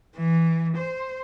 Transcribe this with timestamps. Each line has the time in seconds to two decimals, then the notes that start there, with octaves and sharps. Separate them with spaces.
0.17 E3
0.78 C5